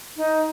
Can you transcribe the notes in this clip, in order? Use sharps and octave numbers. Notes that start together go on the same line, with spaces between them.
D#4